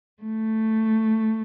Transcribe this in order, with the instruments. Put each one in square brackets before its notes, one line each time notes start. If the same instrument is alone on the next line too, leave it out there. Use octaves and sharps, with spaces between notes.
[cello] A3